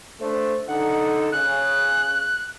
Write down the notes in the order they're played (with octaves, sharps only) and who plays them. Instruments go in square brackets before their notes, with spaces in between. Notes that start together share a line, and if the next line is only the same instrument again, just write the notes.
[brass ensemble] A3 D4 C5
[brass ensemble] D3 D#4 A4 [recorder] F#5
[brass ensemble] C#3 [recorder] F#6